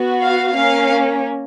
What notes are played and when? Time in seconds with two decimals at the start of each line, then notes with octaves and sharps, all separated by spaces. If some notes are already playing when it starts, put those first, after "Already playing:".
Already playing: B3 F#4
0.21 F5
0.55 A#3 C#4 F5